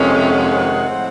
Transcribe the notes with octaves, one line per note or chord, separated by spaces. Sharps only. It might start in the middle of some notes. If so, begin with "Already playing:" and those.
Already playing: F2 C3 D#3 G#3 C#4
E5
F#5
A2 F3 G#3 C4